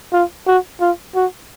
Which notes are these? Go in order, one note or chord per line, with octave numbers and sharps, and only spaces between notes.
F4
F#4
F4
F#4